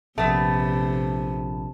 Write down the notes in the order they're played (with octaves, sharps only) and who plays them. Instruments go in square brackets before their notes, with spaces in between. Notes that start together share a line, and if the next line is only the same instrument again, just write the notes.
[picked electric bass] A#1 [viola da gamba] C3 [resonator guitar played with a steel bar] A3 B3 [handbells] A5